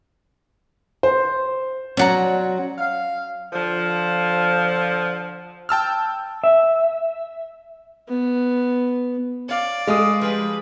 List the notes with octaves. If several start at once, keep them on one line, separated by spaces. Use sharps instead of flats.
C5
F#3 C#4 D5 F#5 A#5
F5
D3 F3
G5 A5 E6 F6
E5
B3
C#5 D5 F5
G#3 A4 F5 D#6
F3 G3 G#4 B4